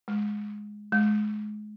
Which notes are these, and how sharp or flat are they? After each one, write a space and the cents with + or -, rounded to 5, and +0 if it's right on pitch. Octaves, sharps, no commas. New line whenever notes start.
G#3 +5
G#3 +30